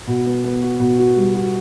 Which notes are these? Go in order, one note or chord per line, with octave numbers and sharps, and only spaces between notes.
B2
B3
B3
F#4
B2
F#4
G3
F#4